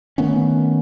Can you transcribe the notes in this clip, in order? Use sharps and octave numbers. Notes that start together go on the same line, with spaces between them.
D#3 A3 B3 C#4